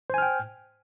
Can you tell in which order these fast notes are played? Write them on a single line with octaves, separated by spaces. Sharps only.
C5 G#5 F6 G5